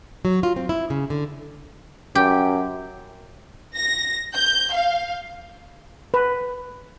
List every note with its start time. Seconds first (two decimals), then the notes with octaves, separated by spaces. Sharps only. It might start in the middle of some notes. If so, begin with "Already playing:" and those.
0.25 F#3
0.43 F4
0.56 C4
0.69 E4
0.90 C#3
1.10 D3
2.15 F#2 G4
3.76 A#6
4.35 G6
4.73 F5
6.14 B4